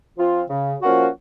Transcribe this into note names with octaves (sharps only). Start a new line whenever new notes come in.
F3 C4 F4
C#3
F3 A#3 C#4 F#4